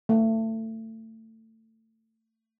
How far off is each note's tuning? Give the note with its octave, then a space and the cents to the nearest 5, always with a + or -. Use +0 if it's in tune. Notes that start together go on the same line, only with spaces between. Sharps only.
A3 +25